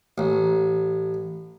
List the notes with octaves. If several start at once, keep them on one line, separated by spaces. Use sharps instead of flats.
A1